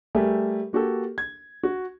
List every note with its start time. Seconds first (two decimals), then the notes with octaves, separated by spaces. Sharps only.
0.15 G3 A3 G4 G#4 A#4 E5
0.73 A#3 F#4 G4 A4
1.18 G#6
1.63 F#4